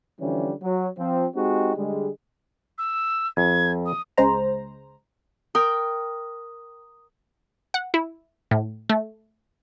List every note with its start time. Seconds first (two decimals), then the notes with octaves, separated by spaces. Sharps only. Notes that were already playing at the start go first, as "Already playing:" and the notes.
0.20 D3 E3 F3 G3 C#4
0.63 F#3
0.98 F3 C4
1.35 G#3 C4 D#4 F#4 G4
1.76 D3 G3 G#3
2.78 E6
3.37 F2 G#6
3.86 D#6
4.17 C#2 C#3 G#3 C5 A#5
5.55 A#4 G5 D#6
7.74 F#5
7.94 E4
8.51 A2
8.89 A3